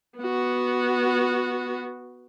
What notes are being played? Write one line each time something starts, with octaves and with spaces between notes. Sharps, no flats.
B3 F#4